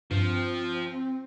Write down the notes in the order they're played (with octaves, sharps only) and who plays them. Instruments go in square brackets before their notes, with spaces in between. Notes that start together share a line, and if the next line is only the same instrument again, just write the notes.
[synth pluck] G2 [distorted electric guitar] F3 [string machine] C4